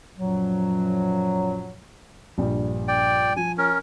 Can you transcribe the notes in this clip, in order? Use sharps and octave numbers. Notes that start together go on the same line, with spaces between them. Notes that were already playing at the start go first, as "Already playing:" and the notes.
F#2 A#2 F3 F#3
A#1 G2 G3
D5 G5
F3 G#5
C#4 A#4